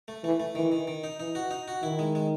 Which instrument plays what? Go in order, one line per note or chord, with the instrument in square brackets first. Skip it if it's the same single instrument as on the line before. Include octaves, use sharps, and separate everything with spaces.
[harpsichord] A3
[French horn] E3 [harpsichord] A3
[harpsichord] A3
[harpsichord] D#3 [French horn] E3
[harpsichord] D#3
D#3
D#4
[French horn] E3 [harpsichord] D#4
[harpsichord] F#4
D#4
F#4
[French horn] D#3 [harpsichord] E4
[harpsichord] G#3
G#3